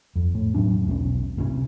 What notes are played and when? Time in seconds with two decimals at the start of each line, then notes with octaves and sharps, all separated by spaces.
0.15 F2
0.35 A2
0.54 E1 F#3 C#4 D4
0.86 E1 B1 C4 C#4
1.37 C2 C3 E3 C#4